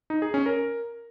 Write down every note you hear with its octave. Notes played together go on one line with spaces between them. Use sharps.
D#4
G#4
C#4
A#4